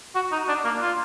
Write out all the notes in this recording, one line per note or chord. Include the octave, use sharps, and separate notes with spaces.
F#4
D#4
D4
A#3
F4